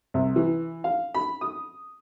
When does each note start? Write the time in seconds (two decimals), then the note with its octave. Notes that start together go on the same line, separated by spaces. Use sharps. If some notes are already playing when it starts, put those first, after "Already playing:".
0.14 C2
0.36 E3
0.84 F5
1.14 B5
1.41 D#6